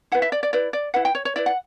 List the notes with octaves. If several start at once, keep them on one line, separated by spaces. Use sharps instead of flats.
E4 B4 F#5
E5
D5
D5
E4 B4 D5
D5
E4 B4 F#5
G5
C#5
C#5
E4 B4 D5
F#5